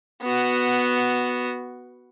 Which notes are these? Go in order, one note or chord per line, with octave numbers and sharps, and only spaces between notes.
B3 F#4